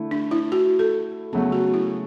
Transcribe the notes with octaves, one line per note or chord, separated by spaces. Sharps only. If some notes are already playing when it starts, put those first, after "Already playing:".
Already playing: D3 A3 E4
D4
E4
F#4
A4
C#3 F#3 A3 B3
F#4
E4